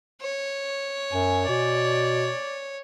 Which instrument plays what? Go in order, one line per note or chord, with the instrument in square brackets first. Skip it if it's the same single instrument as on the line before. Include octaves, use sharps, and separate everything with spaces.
[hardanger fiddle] C#5
[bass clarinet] F#2 [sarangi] G#5
[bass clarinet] B2 [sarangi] D5